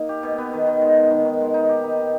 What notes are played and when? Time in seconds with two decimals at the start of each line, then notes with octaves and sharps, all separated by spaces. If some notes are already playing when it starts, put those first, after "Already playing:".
Already playing: A#3 D#4
0.09 G4
0.23 B2
0.38 B3
0.53 D#3
0.67 D#3
0.81 G#3
0.97 G#3
1.11 D#3
1.25 D#3
1.40 G#3
1.54 D#4
1.69 G4
1.83 D#4
1.99 D#4